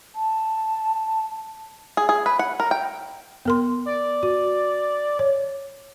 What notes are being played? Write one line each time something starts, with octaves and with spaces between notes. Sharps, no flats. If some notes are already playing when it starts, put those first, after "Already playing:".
A5
G#4
G#4
B4
F#5
A#4
G5
B3 A#4 C6
D5
F#4
C#5